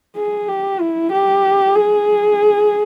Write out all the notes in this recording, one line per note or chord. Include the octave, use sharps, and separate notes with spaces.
G#4
G4
E4
G4
G#4